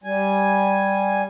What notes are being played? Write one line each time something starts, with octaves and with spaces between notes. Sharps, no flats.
G3 G#5